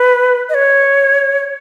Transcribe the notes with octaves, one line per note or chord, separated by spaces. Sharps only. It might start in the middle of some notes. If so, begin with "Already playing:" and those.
Already playing: B4
D#5
C#5